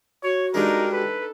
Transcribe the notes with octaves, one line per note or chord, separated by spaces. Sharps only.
F#4 C#5
G2 G3 G#3 D4 D#4 A#4
A4 B4